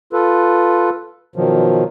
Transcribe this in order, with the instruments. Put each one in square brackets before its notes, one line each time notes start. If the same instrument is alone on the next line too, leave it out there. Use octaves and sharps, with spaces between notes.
[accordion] F4 A4 B4
B2 D#3 F3 F#3